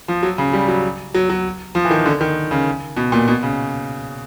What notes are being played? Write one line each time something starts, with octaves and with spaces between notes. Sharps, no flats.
F3
F#3
C#3
G3
F#3
F#3
F#3
F3
E3
D#3
D3
D#3
C#3
B2
A#2
B2
C#3